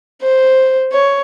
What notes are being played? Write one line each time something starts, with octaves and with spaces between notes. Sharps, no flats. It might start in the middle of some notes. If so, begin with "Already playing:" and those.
C5
C#5